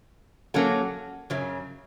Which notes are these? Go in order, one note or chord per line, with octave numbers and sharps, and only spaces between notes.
F#3 A#3 C#4 F#4 A4
F#2 C#3 F#3